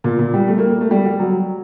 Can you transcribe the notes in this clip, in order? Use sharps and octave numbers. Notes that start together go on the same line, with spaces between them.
A#2
A#2
G3
A3
A#3
A#3
A3
G3
G3
F#3